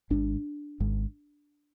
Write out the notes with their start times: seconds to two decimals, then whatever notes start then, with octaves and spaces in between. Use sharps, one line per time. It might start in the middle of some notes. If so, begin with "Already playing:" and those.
0.10 G#1 G#2 D4
0.80 G#1 G#2